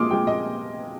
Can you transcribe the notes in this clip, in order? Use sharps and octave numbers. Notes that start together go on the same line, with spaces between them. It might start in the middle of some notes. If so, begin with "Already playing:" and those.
Already playing: A#2 F3 G#3 C6 D6 D#6 F6
A#2 F3 G#3 G5
D#5